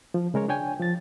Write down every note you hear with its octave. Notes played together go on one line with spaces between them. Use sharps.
F3
C#3 G#3 A#4 C#5
D4 C#5 G5 G#5
F3 A6